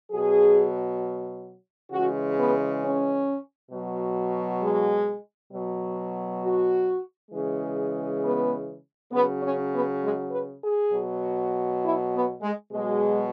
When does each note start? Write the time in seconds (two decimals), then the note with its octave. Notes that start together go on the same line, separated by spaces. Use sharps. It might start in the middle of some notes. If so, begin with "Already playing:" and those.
0.11 B2 F#3 G#4
1.91 C#3 E3 G#3 F#4
2.36 B3
2.82 C#4
3.71 B2 F#3
4.61 G#3
5.51 B2 F#3
6.41 F#4
7.31 C#3 E3 G#3
8.22 B3
9.11 C#3 F#3 B3
9.41 C#4
9.72 B3
10.01 G#3
10.31 B4
10.62 G#4
10.91 B2 F#3
11.81 E4
12.12 B3
12.42 G#3
12.71 B2 F#3 G#3